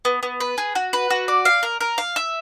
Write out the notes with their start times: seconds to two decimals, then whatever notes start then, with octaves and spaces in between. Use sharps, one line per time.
0.05 B3
0.23 B3
0.40 B4
0.58 G#4
0.75 F#4
0.93 B4
1.10 F#4
1.28 D5
1.45 F5
1.63 A#4
1.81 A#4
1.98 F5
2.16 E5